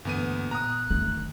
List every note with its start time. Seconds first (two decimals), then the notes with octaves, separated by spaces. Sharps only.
0.05 D2 G2 E3 A#3 B3 D#7
0.51 A#2 B3 A#5 D#6 F#6
0.90 F#1 D3 D#3 A3